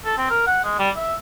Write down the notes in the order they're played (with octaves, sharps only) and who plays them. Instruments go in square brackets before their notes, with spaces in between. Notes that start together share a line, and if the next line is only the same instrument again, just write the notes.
[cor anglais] A4
C4
A#4
F#5
G#3
G3
E5